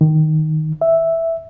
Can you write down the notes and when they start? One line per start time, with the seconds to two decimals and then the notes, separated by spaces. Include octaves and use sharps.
0.01 D#3
0.81 E5